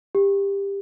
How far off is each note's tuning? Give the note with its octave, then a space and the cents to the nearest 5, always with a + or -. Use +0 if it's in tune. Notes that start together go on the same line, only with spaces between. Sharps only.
G4 +20